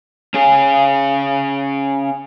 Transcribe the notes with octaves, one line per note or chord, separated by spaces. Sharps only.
C#4 G#4